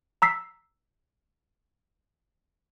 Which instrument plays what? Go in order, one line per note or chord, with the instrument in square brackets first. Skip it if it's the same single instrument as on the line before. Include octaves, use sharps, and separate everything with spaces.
[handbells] A#5 E6 B6 C7